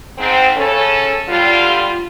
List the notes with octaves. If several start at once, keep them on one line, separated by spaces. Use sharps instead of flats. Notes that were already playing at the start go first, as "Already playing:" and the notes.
G#2 C4
C#3 C#4 A4
D3 G3 F4